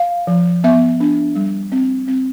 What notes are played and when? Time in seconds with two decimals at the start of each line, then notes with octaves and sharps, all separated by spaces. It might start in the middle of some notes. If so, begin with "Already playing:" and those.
Already playing: F5
0.27 F3
0.64 B3 E5
1.00 D4
1.35 G3
1.72 C4
2.08 C4